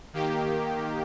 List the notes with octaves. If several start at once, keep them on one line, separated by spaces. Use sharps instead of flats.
D#3 A#3 G4